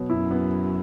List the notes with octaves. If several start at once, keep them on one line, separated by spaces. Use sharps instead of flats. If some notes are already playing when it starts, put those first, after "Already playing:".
Already playing: B2 F#3 B3
F#2 E4
B3